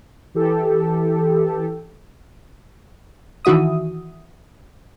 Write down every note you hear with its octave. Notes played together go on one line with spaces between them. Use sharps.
E3 G4 A4
D#3 E3 F#4 E5 D#6